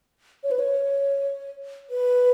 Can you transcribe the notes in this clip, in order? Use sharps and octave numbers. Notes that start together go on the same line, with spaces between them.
C#5
B4
C#5
B4